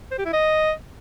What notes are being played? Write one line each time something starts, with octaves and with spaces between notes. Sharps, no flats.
C5
G4
E4
D#5